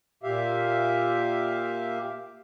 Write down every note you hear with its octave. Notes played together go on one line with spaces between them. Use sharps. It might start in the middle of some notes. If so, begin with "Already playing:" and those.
A#2 G4 E5 F5